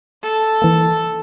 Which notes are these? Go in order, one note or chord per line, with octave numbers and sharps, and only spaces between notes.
A4
E3 A#3